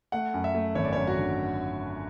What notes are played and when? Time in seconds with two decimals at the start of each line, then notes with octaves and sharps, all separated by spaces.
0.12 A3 F#5
0.34 F#2
0.44 E5
0.55 A3
0.75 G#1 C#5
0.85 D5
0.93 F#2 C#5
1.07 F#4
1.18 D3